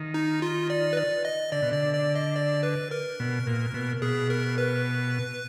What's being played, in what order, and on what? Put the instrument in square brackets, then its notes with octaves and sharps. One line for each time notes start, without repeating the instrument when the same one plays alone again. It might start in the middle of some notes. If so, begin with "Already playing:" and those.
Already playing: [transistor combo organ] D#3
[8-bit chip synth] D#4
F4
D5
B4
D5
D#5
[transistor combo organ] D3 [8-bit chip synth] D5
[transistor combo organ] B2
[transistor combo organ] D3 [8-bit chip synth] D5
[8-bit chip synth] D5
D#5
D5
B4
A#4
[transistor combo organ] B2
A#2
B2
[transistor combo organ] B2 [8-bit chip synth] G#4
[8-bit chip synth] A#4
B4